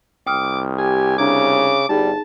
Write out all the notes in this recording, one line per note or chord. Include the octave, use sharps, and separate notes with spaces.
C2 G5 D6 D#6 F6
G4 G#5
C#3 D4 A#5 D6 G#6
G1 G3 D#4 G#4 A5